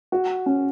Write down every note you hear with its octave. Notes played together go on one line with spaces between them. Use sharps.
F#4
C#4